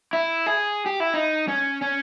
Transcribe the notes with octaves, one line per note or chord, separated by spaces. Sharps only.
E4
G#4
G4
E4
D#4
C#4
C#4